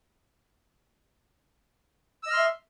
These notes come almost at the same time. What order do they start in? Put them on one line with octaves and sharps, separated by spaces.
E6 D#5 F6 C6 E5